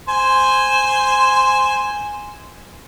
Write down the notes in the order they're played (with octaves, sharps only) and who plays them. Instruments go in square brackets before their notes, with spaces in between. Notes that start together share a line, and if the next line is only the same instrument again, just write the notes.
[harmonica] C5 G#5 C6